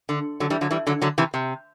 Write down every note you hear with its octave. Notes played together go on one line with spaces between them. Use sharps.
D3
D3 F#3
E3 G3
D3 F#3
E3 G3
D3 F#3
D3 F#3
C3 E3
C3